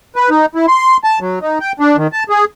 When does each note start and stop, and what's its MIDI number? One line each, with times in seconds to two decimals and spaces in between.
0.16 0.30 71
0.30 0.46 63
0.55 0.66 64
0.68 0.97 84
1.04 1.19 81
1.21 1.39 54
1.42 1.59 63
1.61 1.72 79
1.80 1.96 62
1.97 2.07 51
2.13 2.24 81
2.29 2.45 68